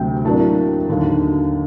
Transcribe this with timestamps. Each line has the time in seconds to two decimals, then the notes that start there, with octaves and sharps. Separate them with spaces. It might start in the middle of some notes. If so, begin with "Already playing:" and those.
Already playing: D2 C3 F#3 C4 G5
0.25 A2 F#3 A#3 D4 A5
0.88 D#2 D3 F#3